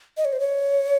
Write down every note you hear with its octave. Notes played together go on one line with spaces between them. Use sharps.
D#5
C#5
C5
C#5